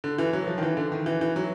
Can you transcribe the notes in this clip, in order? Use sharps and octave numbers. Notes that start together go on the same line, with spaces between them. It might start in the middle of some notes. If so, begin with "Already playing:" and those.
D3
E3
F#3
F3
D#3
E3
D3
D#3
E3
E3
F#3